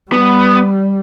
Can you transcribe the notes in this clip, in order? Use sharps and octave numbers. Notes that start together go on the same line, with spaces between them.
G3 B3